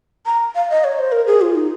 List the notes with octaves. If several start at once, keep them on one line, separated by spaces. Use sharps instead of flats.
A#5
F5
D#5
C#5
C5
A#4
G#4
F4
D#4